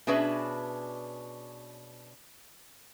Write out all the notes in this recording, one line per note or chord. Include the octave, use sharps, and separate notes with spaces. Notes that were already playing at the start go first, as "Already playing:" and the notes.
B2 C#4 D4 G#4 B4 E5